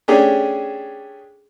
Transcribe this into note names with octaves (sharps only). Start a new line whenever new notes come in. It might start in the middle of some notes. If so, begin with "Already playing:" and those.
A3 C#4 D4 G4 G#4